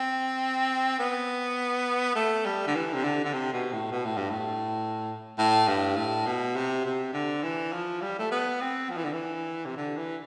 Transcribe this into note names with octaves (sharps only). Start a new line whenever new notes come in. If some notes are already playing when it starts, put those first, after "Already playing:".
Already playing: C4
B3
A3
G3
D3
E3
C3
D3
D3
C3
B2
A2
B2
A2
G2
A2
A2
G2
A2
B2
C3
C3
D3
E3
F3
G3
A3
B3
C4
F3
E3
D3
E3
C3
D3
E3